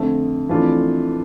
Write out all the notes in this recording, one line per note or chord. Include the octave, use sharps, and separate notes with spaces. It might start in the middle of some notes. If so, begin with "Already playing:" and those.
Already playing: F2 D3 A3
F2 E3 A3 D4 F4